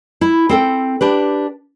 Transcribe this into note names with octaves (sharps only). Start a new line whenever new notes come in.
E4
C4 A4 G5
D4 G4 B4